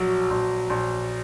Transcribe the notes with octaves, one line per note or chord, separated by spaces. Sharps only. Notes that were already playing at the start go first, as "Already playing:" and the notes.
Already playing: A#1 F#3
A#1
A#1